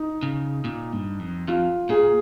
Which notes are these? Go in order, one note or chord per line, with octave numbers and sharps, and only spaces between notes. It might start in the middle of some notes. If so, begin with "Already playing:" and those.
Already playing: D#4
C#3
A#2
G2
F2
F2 F4
A#2 G#4